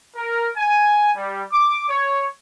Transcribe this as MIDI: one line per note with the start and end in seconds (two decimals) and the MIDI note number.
0.15 0.48 70
0.55 1.09 80
1.15 1.42 55
1.51 1.84 86
1.89 2.25 73